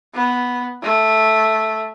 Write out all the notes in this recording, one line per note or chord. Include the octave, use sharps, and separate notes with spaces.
B3
A3